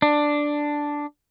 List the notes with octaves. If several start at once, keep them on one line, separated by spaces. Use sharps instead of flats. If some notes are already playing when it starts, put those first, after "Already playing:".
D4